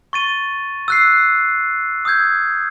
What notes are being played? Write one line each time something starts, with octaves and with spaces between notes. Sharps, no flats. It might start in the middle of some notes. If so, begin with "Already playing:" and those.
C#6 A6 D#7
E6 F#6 C7
D#6 E6 G6 G#6